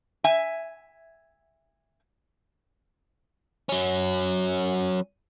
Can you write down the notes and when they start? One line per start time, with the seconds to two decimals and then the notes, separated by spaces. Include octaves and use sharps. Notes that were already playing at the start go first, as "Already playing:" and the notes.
0.24 E5 G#5
3.69 F#3 C#4